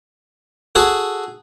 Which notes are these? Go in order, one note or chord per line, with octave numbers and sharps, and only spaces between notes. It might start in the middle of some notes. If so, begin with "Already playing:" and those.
F#4 G#4 A4